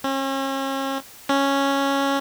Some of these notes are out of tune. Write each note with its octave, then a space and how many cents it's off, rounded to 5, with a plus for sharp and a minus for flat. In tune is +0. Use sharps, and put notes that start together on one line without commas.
C#4 -40
C#4 -5